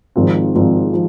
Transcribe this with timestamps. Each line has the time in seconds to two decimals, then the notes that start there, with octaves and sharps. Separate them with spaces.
0.16 G#1 G#2 F3 C4
0.55 G#1 G#2 F3 C4
0.93 F3